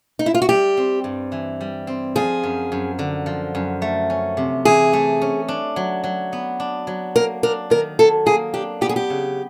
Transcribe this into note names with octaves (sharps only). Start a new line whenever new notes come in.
D#4
E4
F4
F#4
G3 G4
C4
G2
E3
G3
C4
F3 G#4
F#2
F#2
D3
F3
F#2
A3
C#4
C3
E3 G#4
A3
C#4
D4
F#3
F#3
B3
D4
F#3
A#3 A#4
D4 A#4
D#3 A#4
F#3 A4
A#3 G#4
D4 G4
B3 G4
G#4
G4
C#3